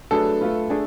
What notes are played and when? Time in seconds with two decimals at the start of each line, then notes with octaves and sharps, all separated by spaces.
0.11 F#3 A3 D4 G#4 A4 B4
0.40 A3 F4 B4
0.69 A3 D4 G#4